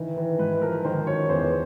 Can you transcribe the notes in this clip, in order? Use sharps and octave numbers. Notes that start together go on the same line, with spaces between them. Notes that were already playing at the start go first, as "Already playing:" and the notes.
Already playing: D#3 E3
E3
G#2 B4
F3 A#4
D#3 C5
F#2 C#5
E2 C5